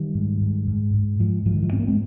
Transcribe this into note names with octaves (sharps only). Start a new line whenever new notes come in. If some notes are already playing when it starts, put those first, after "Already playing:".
Already playing: D#3 G3
G#2
G#2
G#2
G#2
G#2 F3
G#2 F3
D#3
F3
G#2 C4
A#3
G#3 C4